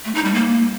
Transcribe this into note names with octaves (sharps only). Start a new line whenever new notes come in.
A3
D#4
G3
A#3